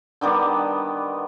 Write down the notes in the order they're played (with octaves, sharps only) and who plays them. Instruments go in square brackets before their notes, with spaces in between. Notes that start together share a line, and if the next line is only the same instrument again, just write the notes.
[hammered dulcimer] D3 D#3 G3 B3